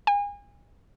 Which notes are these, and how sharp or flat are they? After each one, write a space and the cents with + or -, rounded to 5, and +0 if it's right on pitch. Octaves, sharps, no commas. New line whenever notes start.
G#5 -35